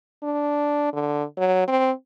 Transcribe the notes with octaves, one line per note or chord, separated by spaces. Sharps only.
D4
D3
F#3
C4